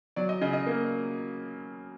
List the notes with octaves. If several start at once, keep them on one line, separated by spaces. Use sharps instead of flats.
F#3 D5
D#5
C#3 D#5
D#5
A#3